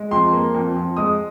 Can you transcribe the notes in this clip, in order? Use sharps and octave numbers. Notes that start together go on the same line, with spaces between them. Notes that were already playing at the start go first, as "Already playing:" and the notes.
Already playing: G#3
F2 C6
A#3
F2
F2
G#3 D#6